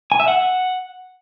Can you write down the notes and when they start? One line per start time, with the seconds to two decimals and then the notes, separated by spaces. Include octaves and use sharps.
0.12 G#5
0.20 E5
0.28 F#5